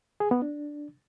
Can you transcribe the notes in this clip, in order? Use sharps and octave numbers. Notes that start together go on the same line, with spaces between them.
G#4
B3
D4